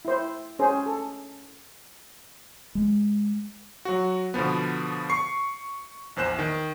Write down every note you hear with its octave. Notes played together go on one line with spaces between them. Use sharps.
E4 C5
C#4 G#4 C5
A4
G#3
F#3 F#4
B2 D3 F3 B3
C#6 C7
A#1 E2 C5 F#6 E7
D#3